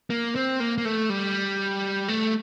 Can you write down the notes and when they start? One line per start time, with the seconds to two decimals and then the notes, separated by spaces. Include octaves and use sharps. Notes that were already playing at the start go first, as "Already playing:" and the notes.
0.10 A#3
0.35 C4
0.60 A#3
0.78 A#3
0.85 A3
1.10 G3
2.08 A3